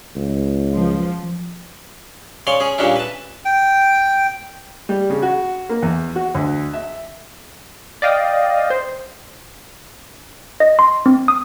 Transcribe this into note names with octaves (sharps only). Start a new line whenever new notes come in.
C#2
F3
C#3 C#5 D5 C6
C#4 G#4
A#2 C#3 G3 C#4 D4 E4
B4 A5
G5
G3
C#3
F#4
A#3
E2
F#4
D2
E5
D5 D#5 F5 G5 D#6
C5
D#5
C6
C4
D#6